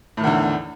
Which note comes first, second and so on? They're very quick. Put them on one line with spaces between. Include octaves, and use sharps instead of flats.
A2 D#3 E2 D3